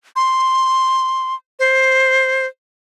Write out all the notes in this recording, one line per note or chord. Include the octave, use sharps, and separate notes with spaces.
C6
C5